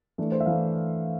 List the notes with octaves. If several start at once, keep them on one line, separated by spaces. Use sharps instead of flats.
E3 A3 D4
C5
E5
E3 A3 D4 F5